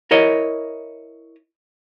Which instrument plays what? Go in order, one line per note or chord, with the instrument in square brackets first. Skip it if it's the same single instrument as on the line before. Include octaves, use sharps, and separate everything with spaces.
[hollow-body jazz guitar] E4 A#4 C#5 D#5